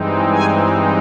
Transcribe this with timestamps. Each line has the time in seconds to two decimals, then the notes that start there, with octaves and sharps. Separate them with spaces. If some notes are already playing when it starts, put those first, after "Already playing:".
Already playing: G2 E3 G#3 C4 D#4
0.31 G#5